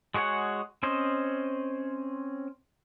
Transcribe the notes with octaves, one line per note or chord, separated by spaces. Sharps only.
G#3 F#4 G#4 C#5 F#5
C4 C#4 C5 D#5